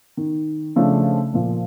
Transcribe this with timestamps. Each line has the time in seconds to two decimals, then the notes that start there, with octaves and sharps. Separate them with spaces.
0.17 D#3
0.76 C#3 F3 A3 D4
1.33 A#2 F3